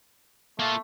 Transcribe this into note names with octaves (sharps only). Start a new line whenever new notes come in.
A3 A#3 F4